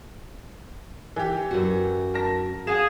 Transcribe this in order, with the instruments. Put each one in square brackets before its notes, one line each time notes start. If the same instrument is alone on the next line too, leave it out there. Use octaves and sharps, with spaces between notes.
[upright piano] E3 G4
[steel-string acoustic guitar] F#2 F#4
[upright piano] A#4 A5 A#6
[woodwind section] G#4 [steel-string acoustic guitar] F5 [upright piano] F#5 G#5 E7